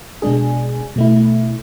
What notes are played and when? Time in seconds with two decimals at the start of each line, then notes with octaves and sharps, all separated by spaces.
0.22 B2 G#3 D4 G#4
0.96 B2 A3 E4